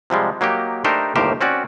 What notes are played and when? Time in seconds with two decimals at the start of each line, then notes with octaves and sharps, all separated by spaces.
0.10 C3 F3 G3 G#3
0.41 F#3 A#3 D#4 G4
0.84 A3 D4 D#4 G4 A#4 C5
1.16 G1 D#2 A2 G4 A#4 C5
1.41 C4 C#4 F#4 D5